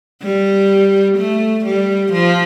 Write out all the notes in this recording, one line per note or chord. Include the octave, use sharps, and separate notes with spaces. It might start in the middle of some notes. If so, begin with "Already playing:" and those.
G3
A3
G3
F3